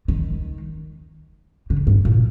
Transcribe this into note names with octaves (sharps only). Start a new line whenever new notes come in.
D#3
D3
G2
A#2